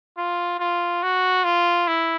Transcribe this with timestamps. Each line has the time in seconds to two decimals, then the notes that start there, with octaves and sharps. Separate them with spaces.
0.18 F4
0.60 F4
1.03 F#4
1.45 F4
1.88 E4